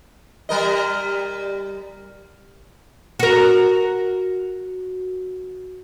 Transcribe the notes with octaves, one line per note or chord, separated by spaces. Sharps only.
G3 A#4 D#5
F#4 A#4